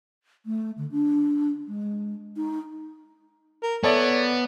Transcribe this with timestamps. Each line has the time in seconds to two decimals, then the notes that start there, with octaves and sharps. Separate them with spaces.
0.46 A3
0.78 D3
0.91 D4
1.68 G#3
2.36 D#4
3.63 A#4
3.84 B3 A4 C#5 D5 E5